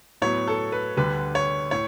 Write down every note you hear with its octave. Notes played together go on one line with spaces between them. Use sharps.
A2 F#3 B3 C#5
A4
B4
D2 D3 G3 B4
C#5
A2 C#5